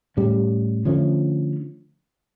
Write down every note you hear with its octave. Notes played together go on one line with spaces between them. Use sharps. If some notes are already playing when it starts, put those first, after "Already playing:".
A2 G3 C#4
D3 F3 A3 C#4